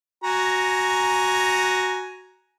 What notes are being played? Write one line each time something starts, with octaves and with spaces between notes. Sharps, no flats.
F#4 G#5 A#5